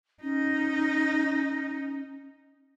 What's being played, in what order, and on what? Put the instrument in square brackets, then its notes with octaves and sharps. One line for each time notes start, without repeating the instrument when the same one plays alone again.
[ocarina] C#4 [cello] D#4